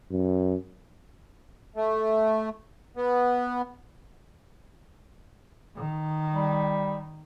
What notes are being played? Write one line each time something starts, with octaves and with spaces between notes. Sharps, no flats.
F#2
A3
B3
D#3
G3